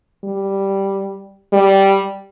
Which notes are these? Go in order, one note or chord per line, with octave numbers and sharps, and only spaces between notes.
G3
G3